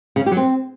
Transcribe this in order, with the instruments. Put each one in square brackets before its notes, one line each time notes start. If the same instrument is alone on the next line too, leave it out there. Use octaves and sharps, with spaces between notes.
[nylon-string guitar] C#3
C#4
G4
F#3
C4